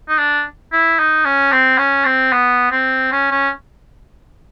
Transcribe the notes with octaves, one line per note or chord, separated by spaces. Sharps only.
D#4
D4
E4
D#4
C#4
C4
C#4
C4
B3
C4
C#4
C#4